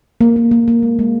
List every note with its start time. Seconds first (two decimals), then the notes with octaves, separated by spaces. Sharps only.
0.21 A#3
0.36 A#3
0.51 A#3
0.68 A#3
0.83 G#3
0.99 G#3